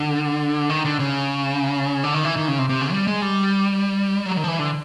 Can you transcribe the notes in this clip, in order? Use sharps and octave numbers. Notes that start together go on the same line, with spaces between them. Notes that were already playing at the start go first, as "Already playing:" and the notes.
Already playing: D3
D#3
D3
C#3
D3
D#3
E3
D#3
C#3
C3
C3
C#3
G3
G#3
G3
F#3
D#3
F3
E3
D3